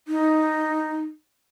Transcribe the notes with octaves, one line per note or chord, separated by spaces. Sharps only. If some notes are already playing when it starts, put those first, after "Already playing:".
D#4